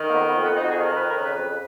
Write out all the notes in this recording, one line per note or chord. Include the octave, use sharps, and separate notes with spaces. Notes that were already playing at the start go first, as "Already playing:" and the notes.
Already playing: D#3
A#3
F2 B3
B3
F2
B3
F2 D#4
F#4
G#4
D#3
A#4
F2 B4
A#4
C#3
B4
F2